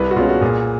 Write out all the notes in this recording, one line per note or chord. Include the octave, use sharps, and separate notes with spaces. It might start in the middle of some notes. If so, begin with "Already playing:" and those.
Already playing: C2 B4
F#4
B2 G#3 C#4 F4
F#4
A#2 G#4